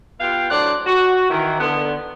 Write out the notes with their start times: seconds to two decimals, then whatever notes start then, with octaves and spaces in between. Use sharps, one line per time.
0.20 B3 F4 G4 F5 G5
0.50 A2 F#3 D4 C5 D5 F#5
0.86 F#4
1.30 D#3 E3
1.60 D3 B3